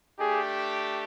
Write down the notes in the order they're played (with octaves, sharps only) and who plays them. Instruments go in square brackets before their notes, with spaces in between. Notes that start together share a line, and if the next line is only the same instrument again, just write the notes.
[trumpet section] A3 D4 G4 [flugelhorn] G#4